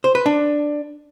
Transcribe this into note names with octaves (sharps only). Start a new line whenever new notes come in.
C5
B4
D4